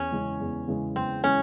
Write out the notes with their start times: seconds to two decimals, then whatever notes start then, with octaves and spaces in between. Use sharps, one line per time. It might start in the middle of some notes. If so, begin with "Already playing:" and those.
Already playing: E2 C#4
0.12 C#3 E3 G#3
0.40 E2
0.68 C#3 E3 G#3
0.96 E2 C4
1.23 C#3 E3 G#3 C#4